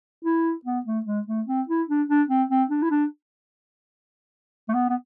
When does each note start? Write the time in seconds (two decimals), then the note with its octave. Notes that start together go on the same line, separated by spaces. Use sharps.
0.24 E4
0.65 B3
0.86 A3
1.06 G#3
1.27 A3
1.47 C4
1.68 E4
1.88 D4
2.08 D4
2.28 C4
2.49 C4
2.70 D4
2.82 E4
2.90 D4
4.69 A3
4.74 B3
4.89 B3